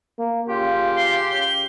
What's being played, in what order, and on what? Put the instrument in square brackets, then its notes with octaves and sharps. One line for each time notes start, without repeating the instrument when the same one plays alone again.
[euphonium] A#3
[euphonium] C#3 [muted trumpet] F4 [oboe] G4
[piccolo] C6
G7